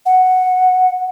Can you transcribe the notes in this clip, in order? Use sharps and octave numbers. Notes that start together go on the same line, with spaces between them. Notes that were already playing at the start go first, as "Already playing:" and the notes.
F#5